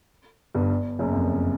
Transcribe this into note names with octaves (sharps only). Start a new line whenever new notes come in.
G1 G2
F#1 F#2
F2